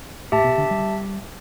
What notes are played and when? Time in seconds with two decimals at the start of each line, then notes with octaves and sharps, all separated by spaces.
0.32 A2 G4 E5 A5
0.44 B2
0.58 D3
0.71 G3